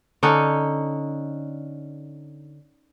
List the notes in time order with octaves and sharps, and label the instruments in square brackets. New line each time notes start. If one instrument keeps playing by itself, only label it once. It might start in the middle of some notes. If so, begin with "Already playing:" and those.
[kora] D3 C#4 D#4